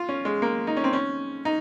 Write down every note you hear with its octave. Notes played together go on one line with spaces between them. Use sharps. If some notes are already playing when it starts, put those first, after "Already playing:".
Already playing: F4
C#4
G#3
A#3
D#4
C#4
C4
C#4
D#4